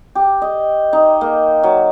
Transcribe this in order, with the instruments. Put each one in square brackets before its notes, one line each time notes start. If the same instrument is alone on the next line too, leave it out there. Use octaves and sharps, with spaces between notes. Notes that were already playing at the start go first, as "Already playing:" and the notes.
[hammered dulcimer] G4
D#5
D#4
A#3
F#3